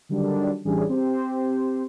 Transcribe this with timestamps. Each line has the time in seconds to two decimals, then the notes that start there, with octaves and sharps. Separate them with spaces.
0.09 D3 D#3 F#3 G3 D4
0.64 A1 E3 G3 C#4 D4 G#4
0.88 C4 G4 C5